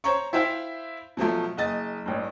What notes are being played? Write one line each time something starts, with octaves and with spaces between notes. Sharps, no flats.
C5 C#5 A#5 C#6
E4 C5 E5 F5 G5
B2 F3 F#3 A3
F#1 D#5 A6
A1 G2